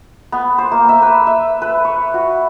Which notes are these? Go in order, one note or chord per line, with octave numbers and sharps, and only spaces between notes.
B3
C5
A#3
E5
B4
E5
B4
C#5
F#4